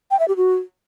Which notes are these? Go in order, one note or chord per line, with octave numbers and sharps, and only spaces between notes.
G5
E5
G4
F#4